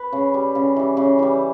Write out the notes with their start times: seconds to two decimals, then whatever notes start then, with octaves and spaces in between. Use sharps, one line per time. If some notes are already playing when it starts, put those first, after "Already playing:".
Already playing: B4
0.12 C#3
0.34 G3
0.55 C#3
0.76 E3 G3
0.97 C#3
1.19 E3 G3